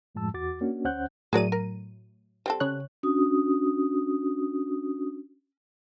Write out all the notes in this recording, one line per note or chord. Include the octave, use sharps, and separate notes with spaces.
F#2 A2 F3 G#3 A5 E6
E2 F#4 D6 A6
A#3 C#4 D4 F#4
D2 C#4 C5 F#5 F#6 G6
A2 F#3 G#4 A#4 D5 D#7
A#4
G3 C4 A4
C#3 C#5 F#6
C#4 D4 F#4 D#6